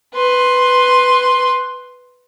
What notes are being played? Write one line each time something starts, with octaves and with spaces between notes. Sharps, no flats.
B4 C6